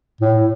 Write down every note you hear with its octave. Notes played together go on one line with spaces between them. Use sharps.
A2